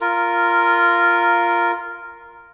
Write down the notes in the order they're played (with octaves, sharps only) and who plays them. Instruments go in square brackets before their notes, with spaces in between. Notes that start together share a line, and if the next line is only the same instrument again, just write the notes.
[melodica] F4 A#4